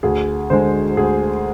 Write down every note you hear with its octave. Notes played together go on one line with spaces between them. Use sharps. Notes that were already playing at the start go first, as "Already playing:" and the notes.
D2 G#4
D3 G#3 C5
D2 G#4